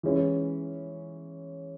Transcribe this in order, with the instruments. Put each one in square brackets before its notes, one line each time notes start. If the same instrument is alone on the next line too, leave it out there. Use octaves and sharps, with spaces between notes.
[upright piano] E3 G#3 C#4 E4